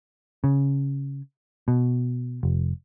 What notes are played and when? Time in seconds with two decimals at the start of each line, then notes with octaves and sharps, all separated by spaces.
0.44 C#3
1.68 B2
2.43 F1